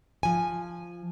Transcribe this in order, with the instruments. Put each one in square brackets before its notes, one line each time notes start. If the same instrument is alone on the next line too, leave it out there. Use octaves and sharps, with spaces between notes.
[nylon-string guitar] F3 G#5